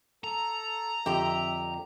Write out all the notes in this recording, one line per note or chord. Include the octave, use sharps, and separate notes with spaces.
A4 A#5
F2 D3 G4 D#5 E5